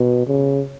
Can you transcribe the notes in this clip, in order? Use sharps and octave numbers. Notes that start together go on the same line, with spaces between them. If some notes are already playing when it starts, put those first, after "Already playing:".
Already playing: B2
C#3